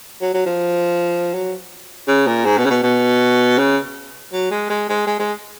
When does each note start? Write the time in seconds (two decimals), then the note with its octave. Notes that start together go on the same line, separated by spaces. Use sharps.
0.22 F#3
0.34 F#3
0.46 F3
1.34 F#3
2.08 C#3
2.27 A#2
2.45 G#2
2.58 B2
2.65 C#3
2.70 B2
2.83 B2
3.58 C#3
4.33 F#3
4.51 G#3
4.70 G#3
4.89 G#3
5.07 G#3
5.19 G#3